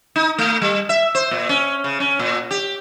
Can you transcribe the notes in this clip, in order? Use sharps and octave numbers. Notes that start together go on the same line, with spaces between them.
D#4
A3
G3
E5
C5
A#2
C#4
C#3
C#4
A#2
G4